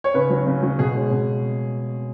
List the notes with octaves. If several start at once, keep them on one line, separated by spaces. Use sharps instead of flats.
C#5
C#3 B4
F#3 C#4
C#3
F#3 C#4
B2 G#4
G#3 C#4
B2